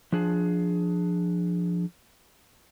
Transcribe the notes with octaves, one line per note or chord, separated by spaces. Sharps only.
F3 D4 G#4